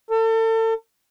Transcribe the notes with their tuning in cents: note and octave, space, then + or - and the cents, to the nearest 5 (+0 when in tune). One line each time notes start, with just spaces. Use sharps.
A4 +35